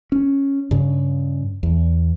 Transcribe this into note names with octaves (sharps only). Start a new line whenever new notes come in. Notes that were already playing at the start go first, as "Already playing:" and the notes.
C#4
G2 C#3
E2